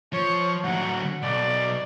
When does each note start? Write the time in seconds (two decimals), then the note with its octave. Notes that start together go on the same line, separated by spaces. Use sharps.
0.13 F3 C#5
0.65 D3 F#3 F#5
1.23 B1 D5